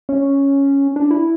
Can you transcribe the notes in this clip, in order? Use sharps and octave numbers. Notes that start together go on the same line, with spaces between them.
C#4
D4
E4